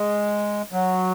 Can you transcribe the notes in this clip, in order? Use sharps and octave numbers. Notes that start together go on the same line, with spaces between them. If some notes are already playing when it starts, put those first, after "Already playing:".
Already playing: G#3
F#3